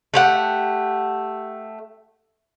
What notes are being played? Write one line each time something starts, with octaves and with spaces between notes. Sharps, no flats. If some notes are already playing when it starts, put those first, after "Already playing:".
A3 G4 F#5